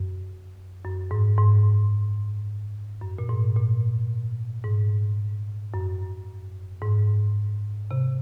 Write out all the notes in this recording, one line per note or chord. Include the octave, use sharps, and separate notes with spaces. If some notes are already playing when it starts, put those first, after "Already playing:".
Already playing: F#2
F#2
G#2
G#2
F#2
A#2
G#2
A#2
G#2
F#2
G#2
C3